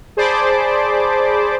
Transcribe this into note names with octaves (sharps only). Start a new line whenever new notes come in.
G#4 C5 D5 A5 B5 D6